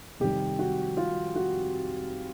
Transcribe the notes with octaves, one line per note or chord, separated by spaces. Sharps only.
F1 F2 C3 D#3 G3 G4
F#4
F4
F#4